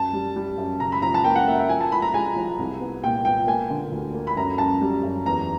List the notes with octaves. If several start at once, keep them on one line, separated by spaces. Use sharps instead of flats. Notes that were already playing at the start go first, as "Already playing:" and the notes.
Already playing: F#2 A5
G3
G3
F#2
C#3 A#5
B5
F3 A#5
A5
A#3 G5
F#5
A#3 E5
E5
F3 G#5
A5
F3 B5
A#5
G#3 G#5
F3
C2
B3
A#2 G5
B3 G5
A#3 G#5
D3
D2
A#3
B5
F#2 A#5
F#2 A5
G3
F#2
E2 A#5